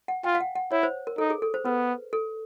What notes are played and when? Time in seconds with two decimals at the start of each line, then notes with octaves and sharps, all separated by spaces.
0.08 F#5
0.24 F4 G5
0.35 F5
0.41 F#5
0.55 F#5
0.72 E4 C#5
0.83 C5
1.07 A#4
1.18 D#4 A4
1.30 G#4
1.42 A4
1.54 C5
1.65 B3 B4
2.13 A4